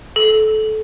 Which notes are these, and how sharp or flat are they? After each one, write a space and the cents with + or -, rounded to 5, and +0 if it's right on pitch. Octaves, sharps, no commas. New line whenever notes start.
A4 -25